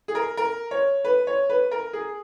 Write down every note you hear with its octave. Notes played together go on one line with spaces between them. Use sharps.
G#4
A#4
A#4
C#5
B4
C#5
B4
A#4
G#4